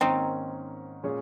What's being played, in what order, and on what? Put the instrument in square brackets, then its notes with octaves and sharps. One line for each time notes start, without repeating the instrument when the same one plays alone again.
[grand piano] G#2 D#3 A#3 C#4 [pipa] C4 D#4
[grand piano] A#2 G#3 C#4 G#4 C#5